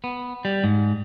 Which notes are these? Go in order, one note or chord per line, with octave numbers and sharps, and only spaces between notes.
B3
G3
G#2